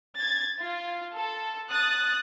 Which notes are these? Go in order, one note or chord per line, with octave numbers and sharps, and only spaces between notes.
G#6 A6
F4
A4
D#6 F#6 A6